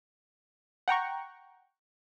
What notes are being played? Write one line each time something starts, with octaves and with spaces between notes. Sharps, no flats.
F#5 G5 A#5 C#6